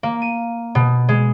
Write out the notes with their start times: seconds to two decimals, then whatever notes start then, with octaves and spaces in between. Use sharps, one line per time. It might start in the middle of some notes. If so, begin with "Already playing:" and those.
0.03 A#3
0.22 D#7
0.75 B2
1.09 G#3